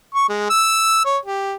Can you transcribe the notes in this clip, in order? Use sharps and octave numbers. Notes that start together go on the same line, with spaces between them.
C#6
G#3
E6
C#5
G4